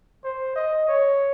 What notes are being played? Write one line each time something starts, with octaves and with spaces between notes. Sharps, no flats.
C5
D#5
C#5